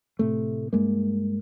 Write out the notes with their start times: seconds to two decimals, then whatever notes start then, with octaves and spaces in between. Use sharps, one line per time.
0.19 A2 C3 A3
0.73 G2 G#3 A#3